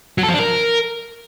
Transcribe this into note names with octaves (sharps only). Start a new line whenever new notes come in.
F#3
A4
F3
D4
A#4